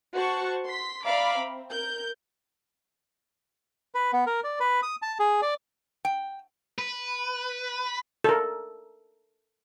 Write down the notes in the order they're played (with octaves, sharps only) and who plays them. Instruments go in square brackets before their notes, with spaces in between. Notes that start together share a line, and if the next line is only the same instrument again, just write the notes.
[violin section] F#4 C5 F#5 A5 C#6
C6 B6
D5 E5 F5 A#5 B5 D6
C4
A#4 G6
[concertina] B4
B3
A#4
D5
B4
D#6
A5
G#4
D5
[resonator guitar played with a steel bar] G5
[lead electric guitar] B4
[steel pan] A4 A#4